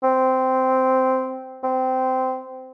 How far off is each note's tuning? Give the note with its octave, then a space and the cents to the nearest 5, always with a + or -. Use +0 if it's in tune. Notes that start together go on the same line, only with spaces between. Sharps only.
C4 -10
C4 -15